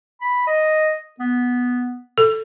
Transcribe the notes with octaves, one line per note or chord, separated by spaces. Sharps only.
B5
D#5
B3
A4